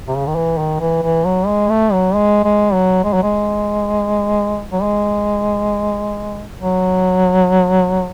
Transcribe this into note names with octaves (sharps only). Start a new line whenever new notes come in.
C3
C#3
D#3
E3
D#3
E3
E3
F#3
G#3
A3
F#3
G#3
G#3
F#3
G#3
F#3
G#3
F#3
G#3
F#3